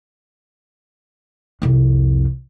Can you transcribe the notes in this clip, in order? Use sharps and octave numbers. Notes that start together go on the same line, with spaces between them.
C2 F2